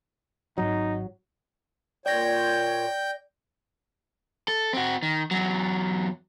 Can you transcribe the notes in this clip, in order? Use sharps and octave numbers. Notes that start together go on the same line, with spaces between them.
G#1 F#3 D#4
A#2 C#5 D5 G5 G6 A#6
A4
C4 F#4
D#3
E2 F#3